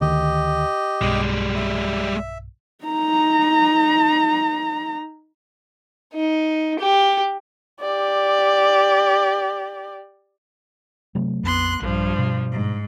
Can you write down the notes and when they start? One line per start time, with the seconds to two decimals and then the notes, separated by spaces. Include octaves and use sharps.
0.01 D2 D#3 G4 D#5
1.02 B1 G2 G3 G#3
1.56 E5
2.85 D#4 A#5
6.14 D#4
6.79 G4
7.81 G4 D5
11.15 C3 F#3 A3
11.44 A#1 F2 B3 C6 F#6
11.82 A#1 G2 F3
12.18 B2
12.52 G#2